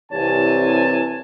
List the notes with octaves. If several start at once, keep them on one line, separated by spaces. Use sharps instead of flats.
C2 C3 E3 C#5 G#5 A5